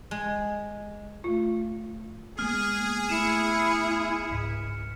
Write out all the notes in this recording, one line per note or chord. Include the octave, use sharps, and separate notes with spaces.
G#3
A3 F4
G#3 A#3 B3 G#4 F6
A3 B3 E4 C#7 E7
C#2 G#2 B6